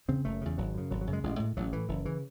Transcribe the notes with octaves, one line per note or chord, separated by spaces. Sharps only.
E2 C#3 C4
F#1 A3
E2 C#3
G#1 F#3
F#2 C#3
G#1 F#3
F#3
F#2 C#3
G#3
A1 G#3
A2
A1 F#3
A2 E3
F#1 E3
C#3 E3